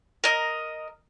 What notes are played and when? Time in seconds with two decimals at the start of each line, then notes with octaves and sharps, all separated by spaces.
0.24 A#4 D#5